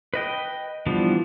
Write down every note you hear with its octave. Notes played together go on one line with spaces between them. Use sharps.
B4 D#5 G5
E3 F3 G3 B3 D4